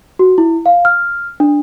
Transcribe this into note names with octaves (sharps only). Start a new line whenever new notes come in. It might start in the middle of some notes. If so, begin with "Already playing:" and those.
F#4
E4
F5
F6
D4